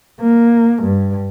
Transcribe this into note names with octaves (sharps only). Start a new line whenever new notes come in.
A#3
G2